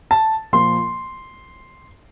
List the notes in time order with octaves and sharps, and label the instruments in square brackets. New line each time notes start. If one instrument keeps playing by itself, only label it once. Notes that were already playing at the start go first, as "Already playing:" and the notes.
[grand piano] A5
A#2 F3 A#3 C6